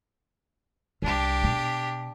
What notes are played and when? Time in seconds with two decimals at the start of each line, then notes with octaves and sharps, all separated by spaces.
1.02 C2 C3 D4 G4
1.44 B2